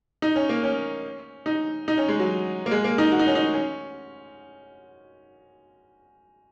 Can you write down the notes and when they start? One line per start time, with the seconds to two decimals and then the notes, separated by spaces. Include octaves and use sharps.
0.22 D#4
0.36 C#4
0.49 A#3
0.63 C#4
1.46 D#4
1.88 D#4
1.98 C#4
2.08 G#3
2.19 F#3
2.66 A#3
2.71 G#3
2.84 A#3
2.98 D#4
3.12 F#4
3.19 D#4
3.27 C#4
3.35 D#4
3.54 C#4